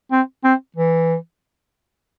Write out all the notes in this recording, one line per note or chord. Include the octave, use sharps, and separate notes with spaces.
C4
C4
E3